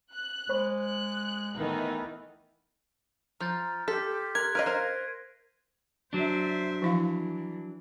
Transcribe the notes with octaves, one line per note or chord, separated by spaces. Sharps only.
F#6
G#3 C5 B5 C#6
F#6
D#3 E3 A3 B3 D#4
F3 A#5 F6 G6 A6
G4 A4 C6 B6
A#4 C6 F6 F#6 G#6
A#4 B4 D#5 F5 D7 D#7
A#4 C5 A#6 C7
F#3 D4 C5 E5
E3 F3 E4 F5